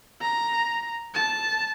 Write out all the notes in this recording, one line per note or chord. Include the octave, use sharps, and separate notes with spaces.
A#5
A5